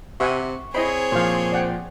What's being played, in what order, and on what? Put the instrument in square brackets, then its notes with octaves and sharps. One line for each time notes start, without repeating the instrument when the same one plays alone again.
[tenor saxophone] C3 [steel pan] E5 F#5 G#5 [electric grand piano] C#6
[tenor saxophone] C4 [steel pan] E4 D#5 B5 [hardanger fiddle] G#4 C#5
[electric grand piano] A#2 F3 [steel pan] C5 F5
[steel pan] D5 F#5 G5